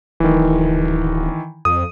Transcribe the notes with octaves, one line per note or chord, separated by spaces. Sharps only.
D1 D#3 E3
F2 D#6